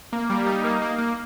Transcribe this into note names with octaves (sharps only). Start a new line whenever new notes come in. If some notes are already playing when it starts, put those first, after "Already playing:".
A#3
G3
D#4
A#3
A#3
A#3